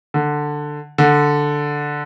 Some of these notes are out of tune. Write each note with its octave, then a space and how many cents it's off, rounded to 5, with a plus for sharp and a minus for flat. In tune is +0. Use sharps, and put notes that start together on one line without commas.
D3 +10
D3 +0